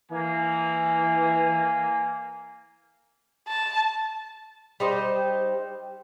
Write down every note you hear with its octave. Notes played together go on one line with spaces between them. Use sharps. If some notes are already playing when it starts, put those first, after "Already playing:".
E3 A#3 G#5
A5
G3 D#4 C5